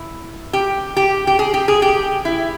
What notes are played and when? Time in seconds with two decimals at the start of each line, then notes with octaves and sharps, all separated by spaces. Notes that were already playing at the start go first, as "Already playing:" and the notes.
Already playing: E4
0.53 G4
0.97 G4
1.27 G4
1.39 G#4
1.54 G4
1.68 G#4
1.82 G4
2.25 E4